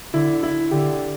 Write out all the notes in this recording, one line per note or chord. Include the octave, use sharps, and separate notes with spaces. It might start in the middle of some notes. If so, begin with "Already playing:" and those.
D3 E4
E4
D3 G4